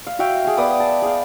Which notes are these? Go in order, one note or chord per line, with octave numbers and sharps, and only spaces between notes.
F5
F#4 E5 F5 G5
G#4 G5
B3 B4 D5 D#6
A5
G#4 F5